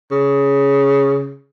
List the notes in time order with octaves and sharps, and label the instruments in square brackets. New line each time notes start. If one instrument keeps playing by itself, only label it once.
[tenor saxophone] C#3